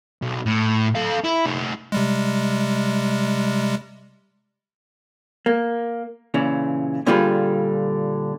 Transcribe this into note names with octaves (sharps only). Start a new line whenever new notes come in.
B1
A2
A4 F5
E4
A3 D#4
C3 G3 G#3
A#3
A#2 C#3 E3
A#2 D3 G3 F4 G#4 B4